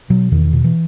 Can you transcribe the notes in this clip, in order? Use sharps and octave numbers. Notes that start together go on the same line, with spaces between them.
B2 F#3
E2 D#3
B2
E3